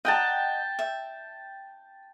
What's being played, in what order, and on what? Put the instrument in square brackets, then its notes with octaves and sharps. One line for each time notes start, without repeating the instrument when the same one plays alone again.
[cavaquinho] D#5 F#5 A#5 [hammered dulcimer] G5 A5
[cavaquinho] E5